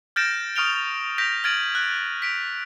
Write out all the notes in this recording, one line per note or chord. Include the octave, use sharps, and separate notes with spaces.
F6 G6 A6 A#6 D7 E7
C#6 D#6 F6 D7 F7 G7
G6 A#6 B6 D7 F7
F6 G#6 A6 D7 D#7 F#7
F#6
B6 D7 F7